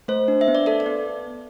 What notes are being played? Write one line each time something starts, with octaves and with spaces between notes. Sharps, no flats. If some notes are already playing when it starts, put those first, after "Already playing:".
A3 C5
D4
E5
B3
D5
A4 D5
D5
B3